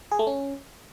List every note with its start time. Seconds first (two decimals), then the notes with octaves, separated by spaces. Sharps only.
0.12 G#4
0.19 A3
0.27 C#4